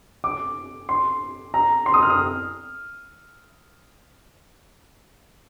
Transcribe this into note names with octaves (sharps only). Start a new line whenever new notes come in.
D6
C6
A#5
C6
D#6
F6
D#6